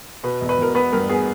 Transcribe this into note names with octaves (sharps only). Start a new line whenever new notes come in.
B2 B4
E1
B4
E1 A#4
B3 B4
G2 A#4
B3 G#4